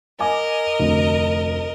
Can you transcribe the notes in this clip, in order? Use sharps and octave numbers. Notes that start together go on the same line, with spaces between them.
A#4 D#5 F5 G#5 D6
F1 D2